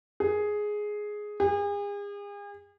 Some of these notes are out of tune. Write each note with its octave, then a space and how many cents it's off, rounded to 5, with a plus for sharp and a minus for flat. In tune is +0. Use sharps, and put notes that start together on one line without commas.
G#4 +5
G#4 -40